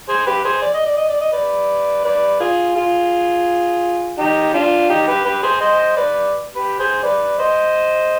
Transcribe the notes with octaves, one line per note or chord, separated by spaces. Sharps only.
G#4 C5
G4 B4
G#4 C5
D5
D#5
D5
D#5
D5
D#5
B4 D5
B4 D5
F4 G#4
F4 G#4
D#4 G4
D4 F4
D#4 G4
G4 B4
G4 B4
G#4 C5
C5 D#5
B4 D5
G4 B4
G#4 C5
B4 D5
C5 D#5